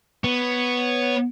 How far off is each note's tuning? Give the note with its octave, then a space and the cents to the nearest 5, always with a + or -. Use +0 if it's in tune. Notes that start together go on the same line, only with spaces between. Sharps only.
B3 +0 C#5 +0